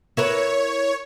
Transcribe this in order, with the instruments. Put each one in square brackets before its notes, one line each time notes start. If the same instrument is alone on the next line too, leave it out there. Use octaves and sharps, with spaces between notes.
[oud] E4 A#4 B4 [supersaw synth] C#5